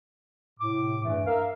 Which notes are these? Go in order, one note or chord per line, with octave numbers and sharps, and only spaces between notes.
A2 C3 D6
E2 G2 E3 A3
A#4 E5 F5